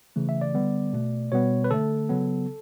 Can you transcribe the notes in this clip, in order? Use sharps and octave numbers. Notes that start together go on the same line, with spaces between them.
C#3 E3 A3
E5
D5
D3 G3 B3
B2 A3
B2 G3 B3 C#5
B4
D3 A3 A4
C#3 F#3 B3